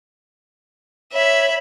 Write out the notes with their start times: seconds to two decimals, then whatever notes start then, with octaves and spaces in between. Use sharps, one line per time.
1.13 C#5 E5 B5